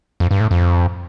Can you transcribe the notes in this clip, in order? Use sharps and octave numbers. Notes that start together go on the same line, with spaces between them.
F2
G2
A2
F2